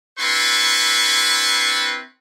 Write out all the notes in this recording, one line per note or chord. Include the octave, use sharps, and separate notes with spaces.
C4 D4 E4 B4 C6 C#6